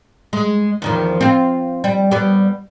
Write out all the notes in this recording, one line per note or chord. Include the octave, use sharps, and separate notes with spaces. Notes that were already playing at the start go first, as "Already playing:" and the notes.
G#3
E2 D#3 F3
C4 F4
G3
G3 B3